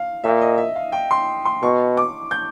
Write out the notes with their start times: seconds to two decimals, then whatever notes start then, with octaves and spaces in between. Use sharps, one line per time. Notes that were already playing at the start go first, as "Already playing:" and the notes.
Already playing: F5
0.24 A#2 E5
0.41 D#5
0.58 E5
0.75 F5
0.92 G5
1.11 C6
1.45 C6
1.63 B2 C#6
1.97 D6
2.31 G6